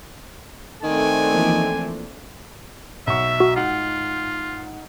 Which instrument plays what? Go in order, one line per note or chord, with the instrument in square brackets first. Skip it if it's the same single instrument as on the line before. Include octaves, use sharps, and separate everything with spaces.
[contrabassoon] D#3 [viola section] A3 C4 D4 [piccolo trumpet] G#5
[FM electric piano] E3 F3 A#3
[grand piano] B1 C#6 [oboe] E5
[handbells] F#4
[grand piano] G#2 F#5 [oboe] F4